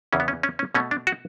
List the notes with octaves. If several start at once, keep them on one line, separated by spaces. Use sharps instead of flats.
E2 C#3 E3 C#4
B3
C#4
C#4
C#4
B2 A3 C#4
D4
F#4